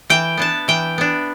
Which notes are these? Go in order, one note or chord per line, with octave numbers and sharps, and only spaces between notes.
E3 G5
B3 D4 A5
E3 G5
B3 D4